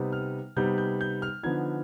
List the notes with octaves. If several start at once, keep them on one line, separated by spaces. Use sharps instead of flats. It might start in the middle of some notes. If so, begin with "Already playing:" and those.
Already playing: C3 G3 B3 D#4
F6
C3 G3 B3 D#4 G6
G6
G6
F6
D3 F3 B3 D#4 G#6